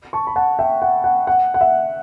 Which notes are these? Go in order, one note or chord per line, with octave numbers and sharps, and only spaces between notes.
A5 C#6
B5
F#5 A5
E5 G5
F#5
F#5
F#5
F#5
E5